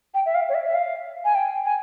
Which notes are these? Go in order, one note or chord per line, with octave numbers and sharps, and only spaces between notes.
G5
E5
F5
C#5
E5
E5
F5
G#5
G5
G#5